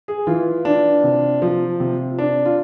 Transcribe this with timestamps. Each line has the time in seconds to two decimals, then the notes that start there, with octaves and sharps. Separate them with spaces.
0.08 G#4
0.27 E3 F4
0.65 D4
1.04 C3
1.42 F3
1.80 C3
2.19 D4
2.45 F4